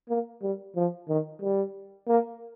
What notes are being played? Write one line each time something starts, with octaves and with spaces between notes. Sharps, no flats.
A#3
G3
F3
D#3
G3
A#3